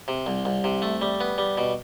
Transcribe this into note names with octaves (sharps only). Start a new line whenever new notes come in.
C3
C2
C2
C3
A3
G3
B3
G3
B2